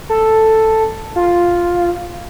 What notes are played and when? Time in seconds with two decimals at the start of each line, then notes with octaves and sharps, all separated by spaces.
0.09 A4
1.16 F4